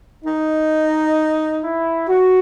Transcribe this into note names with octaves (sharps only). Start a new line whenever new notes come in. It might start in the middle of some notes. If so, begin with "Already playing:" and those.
D#4
E4
F#4